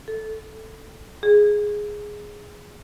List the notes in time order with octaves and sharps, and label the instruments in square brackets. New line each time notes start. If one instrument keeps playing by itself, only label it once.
[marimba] A4
G#4